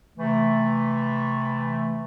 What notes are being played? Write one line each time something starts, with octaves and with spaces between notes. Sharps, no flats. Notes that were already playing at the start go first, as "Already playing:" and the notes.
C3 E3 A3